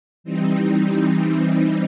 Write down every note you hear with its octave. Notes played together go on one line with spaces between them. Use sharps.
E3 G3 C4 D#4